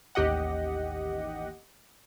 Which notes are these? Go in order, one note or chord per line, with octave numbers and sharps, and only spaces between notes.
A1 D#2 G4 D#5 F#5